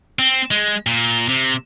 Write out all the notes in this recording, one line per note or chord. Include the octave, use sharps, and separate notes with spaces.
C4
G#3
A#2
C3